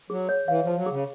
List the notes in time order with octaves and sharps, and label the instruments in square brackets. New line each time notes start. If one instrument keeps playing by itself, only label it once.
[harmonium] F#3 [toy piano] G#4
[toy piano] C#5
[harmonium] E3 [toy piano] F5
[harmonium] F3 [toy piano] A5
[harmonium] F#3
[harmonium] C#3 [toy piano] G#4